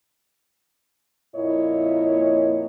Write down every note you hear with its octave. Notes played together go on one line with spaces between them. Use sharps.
F2 A#2 A#3 E4 C#5 D#5